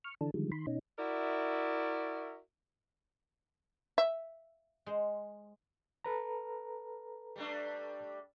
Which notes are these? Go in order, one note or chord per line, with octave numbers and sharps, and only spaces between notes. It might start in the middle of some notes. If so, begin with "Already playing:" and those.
C#6 F6
D3 E3 D4 A4
D3 D#3 F3 G3 G#3
D#3 B5 C6
B2 C#4 D#4
E4 F#4 A#4 D5 E5
E5
G#3 C5
A4 B4 A#5
G3 A3 D4